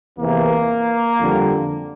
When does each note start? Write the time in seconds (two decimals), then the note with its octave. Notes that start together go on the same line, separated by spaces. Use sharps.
0.18 E2 C3 E3 A#3
1.20 F2 D3 G3